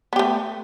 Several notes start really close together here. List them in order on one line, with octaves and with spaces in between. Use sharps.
B3 G4 A3